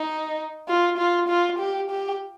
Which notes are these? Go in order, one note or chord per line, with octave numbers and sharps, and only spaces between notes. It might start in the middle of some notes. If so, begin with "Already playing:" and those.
Already playing: D#4
F4
F4
F4
G4
G4